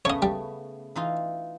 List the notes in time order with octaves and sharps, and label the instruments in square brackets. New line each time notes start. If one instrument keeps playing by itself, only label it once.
[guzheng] C#3 A3 B3 [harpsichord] C#5 D#5
[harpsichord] G3
[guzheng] E3 D#4 F4